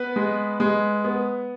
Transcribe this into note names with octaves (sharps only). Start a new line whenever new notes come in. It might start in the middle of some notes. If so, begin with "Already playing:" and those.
Already playing: B3 B4
G#3
G#3
B3